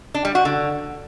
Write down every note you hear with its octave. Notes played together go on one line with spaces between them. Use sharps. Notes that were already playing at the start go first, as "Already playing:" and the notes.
D4
G3
F#4
D3